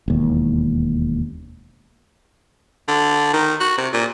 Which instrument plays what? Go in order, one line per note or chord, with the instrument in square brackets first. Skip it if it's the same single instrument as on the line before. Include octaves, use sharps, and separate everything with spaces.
[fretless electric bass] E1 D#2
[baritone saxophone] D3
D#3
F#4
C3
A#2